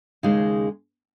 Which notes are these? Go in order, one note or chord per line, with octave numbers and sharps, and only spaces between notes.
D#2 C#3 G#3 D#4